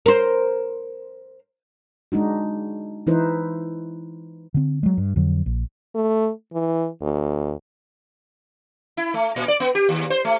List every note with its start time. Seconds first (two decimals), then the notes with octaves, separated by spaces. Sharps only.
0.06 A#4 C5
2.12 G#3 D4 D#4 F#4
3.07 E3 D#4 E4 B4 C5
4.54 D3 C4
4.83 F#3 G#3
4.97 G2
5.16 F2 D3 F#3
5.46 A#1
5.95 A3
6.53 E3
7.02 D2
8.97 E4
9.14 A3
9.36 A#2
9.48 D5
9.60 B3
9.75 G4
9.89 D#2
10.10 C5
10.25 A3